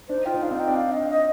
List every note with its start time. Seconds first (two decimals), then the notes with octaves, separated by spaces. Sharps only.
0.09 D4 C5
0.17 D#4
0.25 F4 G5
0.34 D#4
0.42 D4 F5
0.51 C4
0.54 F5
0.59 D#4 G5
0.67 D4
0.75 F5
0.92 D#5
1.09 D#5